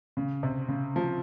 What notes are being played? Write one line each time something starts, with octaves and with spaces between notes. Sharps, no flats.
C#3
C3
C#3
F3